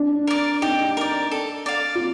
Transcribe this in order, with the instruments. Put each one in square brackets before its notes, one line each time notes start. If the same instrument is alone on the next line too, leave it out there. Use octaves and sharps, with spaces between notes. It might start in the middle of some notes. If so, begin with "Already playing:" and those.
Already playing: [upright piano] D4
[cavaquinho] A#4 D5
[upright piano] D#4 [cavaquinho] G4
[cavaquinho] A#4 D5
A4
D5 F5
[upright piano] F4